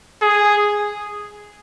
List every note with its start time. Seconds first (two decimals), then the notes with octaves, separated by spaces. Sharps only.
0.22 G#4